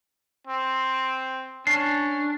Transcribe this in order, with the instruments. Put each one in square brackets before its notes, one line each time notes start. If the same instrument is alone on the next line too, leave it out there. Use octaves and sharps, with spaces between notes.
[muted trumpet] C4
[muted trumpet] C#4 [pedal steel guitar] D4 [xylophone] C7